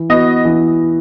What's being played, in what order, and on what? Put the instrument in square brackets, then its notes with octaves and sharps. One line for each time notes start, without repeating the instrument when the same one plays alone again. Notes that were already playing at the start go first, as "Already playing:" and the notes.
Already playing: [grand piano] E3
[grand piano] B3 F#4 [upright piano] D#5
[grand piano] E3